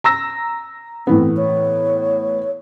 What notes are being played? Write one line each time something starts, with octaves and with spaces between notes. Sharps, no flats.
A#5 E6 A#6
A2 E3 B3 C4
C#5